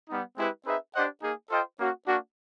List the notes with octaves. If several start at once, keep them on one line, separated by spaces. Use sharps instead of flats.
G3 B3 D#4
G#3 C4 E4 G4 B4
C4 D#4 G#4 B4 E5
D4 G4 C5 D#5 F#5
A#3 D#4 G#4
F4 A4 C5 D#5 G5
A#3 C#4 F#4
A#3 D4 F#4